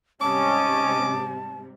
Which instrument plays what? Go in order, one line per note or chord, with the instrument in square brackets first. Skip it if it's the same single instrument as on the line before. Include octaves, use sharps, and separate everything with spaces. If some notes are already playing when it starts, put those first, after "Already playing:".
[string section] G#2 C3 G3 [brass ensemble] C#4 D#5 [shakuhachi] A5 [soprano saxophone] D6